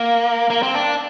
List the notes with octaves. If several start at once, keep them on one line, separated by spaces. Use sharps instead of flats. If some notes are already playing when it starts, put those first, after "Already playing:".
Already playing: A#3
A#3
C4
D4